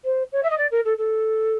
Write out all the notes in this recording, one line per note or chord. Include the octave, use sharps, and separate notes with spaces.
C5
C#5
E5
D#5
D5
A#4
A4
A4